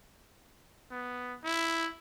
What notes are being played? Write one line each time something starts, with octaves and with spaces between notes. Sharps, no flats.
B3
E4